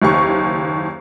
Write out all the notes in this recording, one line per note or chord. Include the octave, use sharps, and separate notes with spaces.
F#1 D#2 C#6